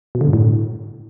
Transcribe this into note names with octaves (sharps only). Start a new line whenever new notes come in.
B2
D3
G2
A2